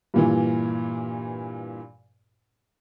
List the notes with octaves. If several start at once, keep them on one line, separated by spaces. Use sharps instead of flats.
G2 A#2 E3